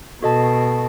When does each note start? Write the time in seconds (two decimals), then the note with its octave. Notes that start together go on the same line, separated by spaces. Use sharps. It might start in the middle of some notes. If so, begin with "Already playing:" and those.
0.22 B2 F#4 A4 D#5 A5